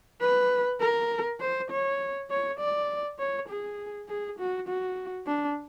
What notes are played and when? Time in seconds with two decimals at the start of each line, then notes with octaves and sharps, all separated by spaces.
0.21 B4
0.80 A#4
1.40 C5
1.70 C#5
2.30 C#5
2.59 D5
3.19 C#5
3.48 G#4
4.08 G#4
4.39 F#4
4.68 F#4
5.27 D4